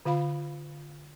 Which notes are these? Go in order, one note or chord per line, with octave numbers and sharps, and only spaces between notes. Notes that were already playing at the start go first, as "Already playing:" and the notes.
D3 F4 F5 B5